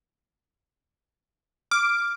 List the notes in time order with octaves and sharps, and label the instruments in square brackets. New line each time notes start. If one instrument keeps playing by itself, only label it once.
[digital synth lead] D6 [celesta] F6